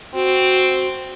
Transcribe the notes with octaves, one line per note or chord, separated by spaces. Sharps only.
C4 F#4